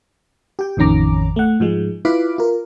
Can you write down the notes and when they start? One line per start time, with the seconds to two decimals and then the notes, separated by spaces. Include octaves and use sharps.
0.59 G4 G5
0.77 A1 F2 D#3 C#4 A#5 D6
1.36 A3 F#5
1.60 G#2 F3 G#3
2.05 E4 F4 B4 F5 B5 D6
2.38 F4 A#4